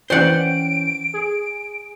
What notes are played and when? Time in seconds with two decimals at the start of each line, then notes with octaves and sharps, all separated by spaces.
0.10 E3 C#4 C5 D5 F#5 G5 D7
1.14 G#4